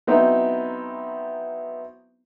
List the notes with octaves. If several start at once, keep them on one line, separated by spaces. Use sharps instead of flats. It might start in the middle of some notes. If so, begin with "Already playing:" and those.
F#3 B3 C4 D#4 E4